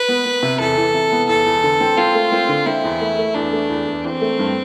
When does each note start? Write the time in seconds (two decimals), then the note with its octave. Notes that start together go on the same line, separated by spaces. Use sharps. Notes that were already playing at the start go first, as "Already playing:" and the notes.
Already playing: B4
0.08 B3
0.25 B3
0.43 C3
0.60 E2 A4
0.77 E3
0.94 C3
1.12 B3
1.29 E2 A4
1.46 E2
1.63 D3
1.81 C4
1.97 C4 F4
2.15 A3
2.32 C4
2.49 D3
2.66 C4 E4
2.84 E2
3.01 A3
3.18 A3
3.35 E2 D4
3.52 A3
3.70 E2
3.87 E2
4.04 E3 C4
4.21 A3
4.39 G2